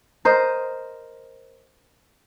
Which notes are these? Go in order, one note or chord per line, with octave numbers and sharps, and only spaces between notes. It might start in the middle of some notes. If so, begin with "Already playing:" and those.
A#4 C5 D#5